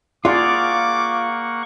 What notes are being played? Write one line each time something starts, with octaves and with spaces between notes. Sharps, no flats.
A#3 F4 G#4 D5 F5 F#5 C#6 D6